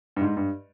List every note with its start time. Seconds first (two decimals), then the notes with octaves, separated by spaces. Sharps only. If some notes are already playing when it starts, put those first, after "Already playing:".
0.16 G2
0.21 G#2
0.37 G2